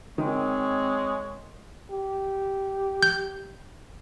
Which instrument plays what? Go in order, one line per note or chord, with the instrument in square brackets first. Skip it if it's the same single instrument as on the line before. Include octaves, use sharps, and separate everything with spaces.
[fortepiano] D#3 [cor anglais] G#3 [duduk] C4 [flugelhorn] C#5
[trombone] G4
[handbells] G6